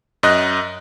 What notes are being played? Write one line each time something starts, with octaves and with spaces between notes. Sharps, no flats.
F#2 D#5 F#6